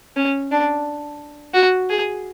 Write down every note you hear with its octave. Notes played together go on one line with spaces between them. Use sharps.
C#4
D4
F#4
G#4